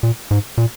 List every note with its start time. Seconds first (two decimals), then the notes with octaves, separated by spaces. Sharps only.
0.03 A#2
0.31 G#2
0.58 A#2